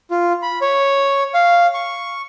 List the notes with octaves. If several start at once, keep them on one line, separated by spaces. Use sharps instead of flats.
F4
B5
C#5
F5
C#6